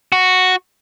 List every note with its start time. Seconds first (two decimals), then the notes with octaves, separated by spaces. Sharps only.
0.12 F#4